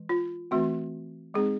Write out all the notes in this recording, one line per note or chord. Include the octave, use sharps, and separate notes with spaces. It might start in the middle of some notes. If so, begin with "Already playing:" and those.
Already playing: E3 G#3
F4
E3 A3 C4 F#4
G#3 C4 D#4 G#4